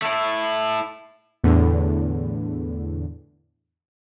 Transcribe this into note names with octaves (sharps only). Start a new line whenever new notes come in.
A3 E4
E2 A2 D3